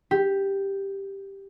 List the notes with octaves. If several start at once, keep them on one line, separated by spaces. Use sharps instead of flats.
G4